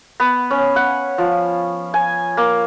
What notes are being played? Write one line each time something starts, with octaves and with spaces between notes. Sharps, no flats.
B3
C#4
F#5
F3
G#5
A#3